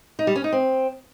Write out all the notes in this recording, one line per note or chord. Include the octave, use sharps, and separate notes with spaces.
D#4
G3
C#4
D#4
C4